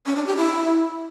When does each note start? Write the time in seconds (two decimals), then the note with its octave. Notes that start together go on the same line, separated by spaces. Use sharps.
0.06 C#4
0.16 D4
0.26 G4
0.37 E4